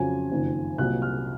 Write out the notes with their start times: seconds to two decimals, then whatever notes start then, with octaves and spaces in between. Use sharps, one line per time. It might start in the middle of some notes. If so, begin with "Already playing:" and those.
Already playing: F2 C#3 F#3 G#5
0.31 F#1 F2 D#3
0.78 C2 A#2 F#3 F#6
1.02 F6